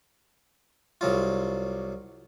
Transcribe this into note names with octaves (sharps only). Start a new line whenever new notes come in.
C2 F#3 F4